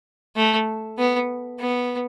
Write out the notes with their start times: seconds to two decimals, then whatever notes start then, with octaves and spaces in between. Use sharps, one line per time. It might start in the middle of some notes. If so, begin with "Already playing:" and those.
0.36 A3
0.99 B3
1.60 B3